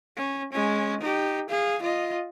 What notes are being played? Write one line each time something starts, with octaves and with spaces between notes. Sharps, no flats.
C#4
G#3 C#4
D#4 G4
G#4 F5
F4 D#5